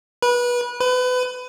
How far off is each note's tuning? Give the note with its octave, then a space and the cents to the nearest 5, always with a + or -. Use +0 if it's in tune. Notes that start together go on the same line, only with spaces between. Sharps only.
B4 -25
B4 +30